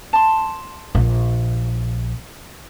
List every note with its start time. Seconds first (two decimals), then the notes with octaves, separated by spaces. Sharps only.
0.13 A5 C6
0.95 A#1